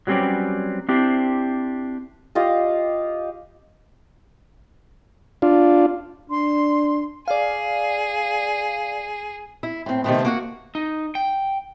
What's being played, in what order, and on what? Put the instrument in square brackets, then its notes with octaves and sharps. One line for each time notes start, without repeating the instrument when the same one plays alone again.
[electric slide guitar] F#3 G3 C4 C#4 B4 D5
C4 D4 E4 G4 C5
[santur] F4 G4 D#5 F5
[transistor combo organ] D4 F4
[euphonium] D4 [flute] C6
[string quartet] G#4 [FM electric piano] D5 F5
[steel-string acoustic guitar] E4
A2 C4
C3 D#3 E3 A3 B3 C4
A#3 F#4 F#5
[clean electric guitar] D#4
G5